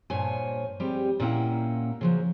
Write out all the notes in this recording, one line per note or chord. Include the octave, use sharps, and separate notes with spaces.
G2 A#2 C5 C#5 G#5
G3 C4 G4 G#4
A#2 A#3 C#4 E4 F#5 G5
C#3 F3 F#3